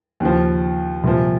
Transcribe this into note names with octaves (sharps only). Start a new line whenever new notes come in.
D#2 C#3 F3
C2 A#2 F3